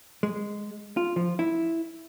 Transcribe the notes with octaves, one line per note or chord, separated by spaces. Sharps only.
G#3
F4
F3
E4